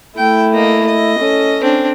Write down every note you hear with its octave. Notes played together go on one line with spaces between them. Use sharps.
A3 E4 G5
A#3 D#5
D#5
C#4 A4
C4 D4